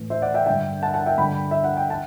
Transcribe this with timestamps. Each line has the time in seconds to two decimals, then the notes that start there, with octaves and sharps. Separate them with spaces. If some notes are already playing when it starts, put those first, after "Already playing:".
Already playing: A2 E3
0.10 C5 E5
0.22 D5 F#5
0.34 E5 G5
0.46 G2 D3 E5 G5
0.82 F#5 A5
0.94 F#5 A5
1.06 E5 G5
1.18 G2 D3 G5 B5
1.51 E5
1.64 F#5
1.77 G5
1.90 F#5 A5